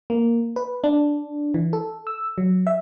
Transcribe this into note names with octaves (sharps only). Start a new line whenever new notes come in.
A#3
B4
D4
E3
A4
E6
F#3
E5